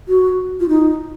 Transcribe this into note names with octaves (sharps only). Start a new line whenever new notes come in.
F#4
F4
D#4